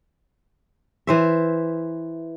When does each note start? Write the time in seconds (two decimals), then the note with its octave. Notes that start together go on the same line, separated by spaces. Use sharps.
1.07 E3 C5 E5